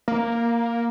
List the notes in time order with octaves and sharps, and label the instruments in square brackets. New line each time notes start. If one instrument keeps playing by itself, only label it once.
[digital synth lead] A#3